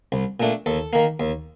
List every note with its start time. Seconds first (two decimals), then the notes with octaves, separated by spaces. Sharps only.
0.12 C2
0.40 A#2 A3 D4
0.66 D#2 A4
0.93 D#3 A#3
1.20 D#2